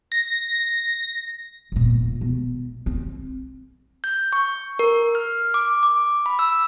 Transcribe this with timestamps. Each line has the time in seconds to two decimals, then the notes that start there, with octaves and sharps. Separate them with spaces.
0.12 A#6
1.72 E1 A#2
2.21 B2
2.86 C4
4.04 G6
4.33 C#6
4.79 A#4
5.15 F6
5.54 D6
5.83 D6
6.26 B5
6.39 E6